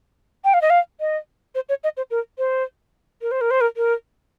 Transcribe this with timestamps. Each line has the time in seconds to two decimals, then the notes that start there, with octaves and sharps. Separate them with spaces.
0.44 G5
0.54 F5
0.62 D#5
0.70 F5
1.00 D#5
1.55 C5
1.69 C#5
1.84 D#5
1.97 C5
2.11 A#4
2.38 C5
3.22 A#4
3.31 C5
3.41 A#4
3.51 C5
3.61 A#4
3.77 A#4